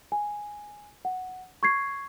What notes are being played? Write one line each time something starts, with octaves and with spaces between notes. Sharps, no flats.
G#5
F#5
C#6 G#6 C7